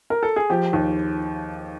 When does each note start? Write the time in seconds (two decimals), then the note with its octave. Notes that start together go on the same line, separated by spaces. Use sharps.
0.10 A#4
0.23 A4
0.36 G#4
0.50 F3 G4
0.73 D#2